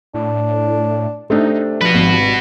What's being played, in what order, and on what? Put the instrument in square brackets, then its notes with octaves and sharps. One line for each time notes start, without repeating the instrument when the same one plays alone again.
[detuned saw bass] A2 [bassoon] D4
[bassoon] C3 [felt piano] A3 D4 [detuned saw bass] D#4
[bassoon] G2 [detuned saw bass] F3 [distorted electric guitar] F#4 B4
[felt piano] G#1